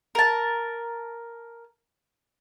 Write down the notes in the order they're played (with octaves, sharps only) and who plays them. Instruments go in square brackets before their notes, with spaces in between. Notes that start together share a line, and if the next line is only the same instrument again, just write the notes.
[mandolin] A#4 A5